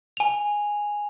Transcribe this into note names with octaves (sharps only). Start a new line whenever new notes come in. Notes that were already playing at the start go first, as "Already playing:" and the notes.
G#5 F7